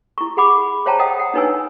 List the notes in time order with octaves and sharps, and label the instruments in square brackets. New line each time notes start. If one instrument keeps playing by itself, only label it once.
[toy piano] E4 C#6
G#4 F#5 B5 D6
C5 C#5 F5 G5 A5 A#5
D#5 F#5 G5 D#6
F#5
D4 D#4 B4 C#5 G#5 E6